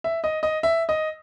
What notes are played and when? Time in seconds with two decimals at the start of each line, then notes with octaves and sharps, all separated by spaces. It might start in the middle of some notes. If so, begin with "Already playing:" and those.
0.04 E5
0.24 D#5
0.43 D#5
0.63 E5
0.89 D#5